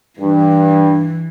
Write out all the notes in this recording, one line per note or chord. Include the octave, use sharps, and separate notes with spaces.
G2 E3